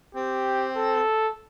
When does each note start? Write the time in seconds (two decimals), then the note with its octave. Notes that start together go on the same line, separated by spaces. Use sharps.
0.15 C4 G4
0.76 A4